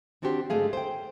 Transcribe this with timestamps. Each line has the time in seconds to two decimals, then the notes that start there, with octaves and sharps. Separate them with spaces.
0.22 D#3 C4 D4 F#4 G4 C5
0.50 G#2 D3 G#3 A3 G#4 F5
0.73 C5 G5